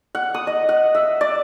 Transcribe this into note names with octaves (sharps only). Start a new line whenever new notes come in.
F#5
D#6
D#5
F#5
E5
D5